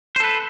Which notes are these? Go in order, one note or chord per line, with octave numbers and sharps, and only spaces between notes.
A4 B4 C5